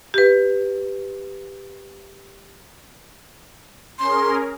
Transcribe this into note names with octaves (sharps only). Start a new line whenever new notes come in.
G4 B4
C#4 G#4 A#4 C6